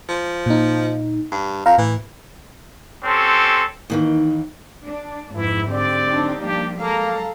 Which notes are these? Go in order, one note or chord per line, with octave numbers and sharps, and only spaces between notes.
F3
A#2 D#4
G2
F2 F5 A#5
A2 E3
C4 C#4 G4 A4 C6
D#2 D#3 E3
D4
F2 G#2 E3 E4
D3 C4 G4 D5
F#3 D4 D#4
F3 G3 A#3 D4 G4
F#3 G#3 A#3 A4 F5 A5 A#5